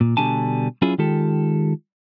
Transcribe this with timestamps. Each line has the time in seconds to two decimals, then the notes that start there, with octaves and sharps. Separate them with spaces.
0.01 A#2
0.17 B2 D3 G3 D4 G#5 A5
0.82 F#3 C#4 E4 F4 G#4
0.98 D#3 G#3 F4 G4 A4